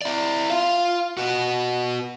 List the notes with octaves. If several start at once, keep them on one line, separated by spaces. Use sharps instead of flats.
E4 D5
F4 F5
B3 F#4